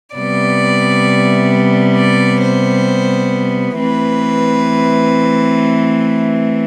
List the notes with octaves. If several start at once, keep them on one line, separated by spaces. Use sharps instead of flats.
C3 G3 B3 D5
D5
C5
E3 A3 C4 B4